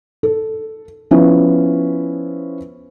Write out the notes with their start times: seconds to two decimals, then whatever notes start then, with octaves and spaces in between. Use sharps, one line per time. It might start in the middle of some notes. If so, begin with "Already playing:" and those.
0.23 A4
1.11 F3 B3 C#4 E4